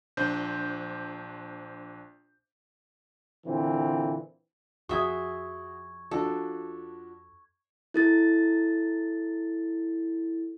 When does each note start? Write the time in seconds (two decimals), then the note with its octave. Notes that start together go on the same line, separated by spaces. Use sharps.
0.17 A#1 D4 C5 G6
3.46 A#2 D3 E3 C4
4.89 F2 F#4 G#4 E5 C#6 D#6 G#6
6.11 F3 D4 F#4 A4
7.94 E4 A4 A6